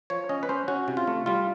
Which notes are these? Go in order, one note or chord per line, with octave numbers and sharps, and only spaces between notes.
F3 C#5
C#4 D#5
B4
C#4 C5
C#4 F#4
C3
F4
A3
G3 F4